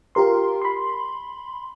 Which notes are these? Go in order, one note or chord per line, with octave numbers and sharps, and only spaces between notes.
F4 G4 A#4 C6
B5 C6